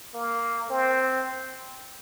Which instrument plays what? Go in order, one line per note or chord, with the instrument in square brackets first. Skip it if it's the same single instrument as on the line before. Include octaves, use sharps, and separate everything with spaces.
[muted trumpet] A#3
C4